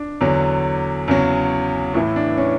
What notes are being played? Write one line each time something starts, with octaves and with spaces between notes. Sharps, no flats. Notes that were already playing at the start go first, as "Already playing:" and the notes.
Already playing: D4
E2 D3 F#3
E2 C#3 F#3
A2 E3 E4
D4
C#4